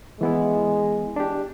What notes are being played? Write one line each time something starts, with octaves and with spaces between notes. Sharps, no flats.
E3 G#3 B3 E4
D4 G4